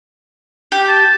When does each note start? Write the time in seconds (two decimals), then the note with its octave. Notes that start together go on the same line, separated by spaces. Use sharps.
0.72 G4
0.88 A5